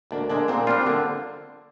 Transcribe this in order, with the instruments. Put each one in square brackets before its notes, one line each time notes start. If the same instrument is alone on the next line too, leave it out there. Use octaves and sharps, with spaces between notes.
[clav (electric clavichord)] D2 [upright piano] A#3 D4
[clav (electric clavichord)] D3 G#3 [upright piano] A#3 D4
[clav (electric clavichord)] A#2 [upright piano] C4
[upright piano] A#3
[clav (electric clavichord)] G3 D4 F4 [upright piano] C4
[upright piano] C4
[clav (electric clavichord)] D3 [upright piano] A#3